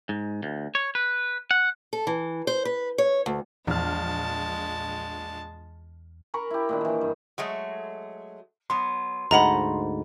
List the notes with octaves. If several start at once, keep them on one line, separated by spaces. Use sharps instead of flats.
G#2
D2
C#5
B4
F#5
A4
E3
C5
B4
C#5
D2
A#1 E2 G#3 A5 F6
A#4 A#5 B5 C#6
E4 G4
A#2 D#3 D4
D#3 E3
G2
F#3 G#3 A3
F#3 B3 C6
D2 G#2 A#3 D#5 F#5 A#5 B5